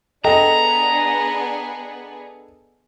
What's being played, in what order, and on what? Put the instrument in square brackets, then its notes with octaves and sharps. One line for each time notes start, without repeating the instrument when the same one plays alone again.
[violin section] B3 D4 G#4 [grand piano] A4 D#5 G5 [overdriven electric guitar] A#5